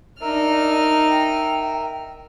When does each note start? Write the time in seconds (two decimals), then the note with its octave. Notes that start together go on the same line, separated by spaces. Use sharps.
0.21 D4 D#4 A#4 E5 F6
1.10 G5